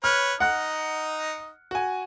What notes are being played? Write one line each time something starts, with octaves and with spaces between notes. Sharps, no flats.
B4 C#5 F6
D#4 D#5 F#5 F#6
F#4 G#5